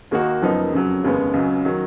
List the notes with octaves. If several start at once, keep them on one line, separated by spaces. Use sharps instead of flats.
D#2 D#3 A#3 D#4 F#4
F#1 F#2 F3 B3 D#4
F2 C#3 F#3
F1 D#2 C#3 G#3 B3
C#2 C#3 F#3
D#3 F#3